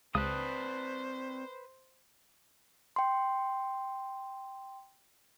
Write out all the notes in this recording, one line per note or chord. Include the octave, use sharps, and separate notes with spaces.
C#2 C4 B4 C5 D5 A5 D#6
G5 C6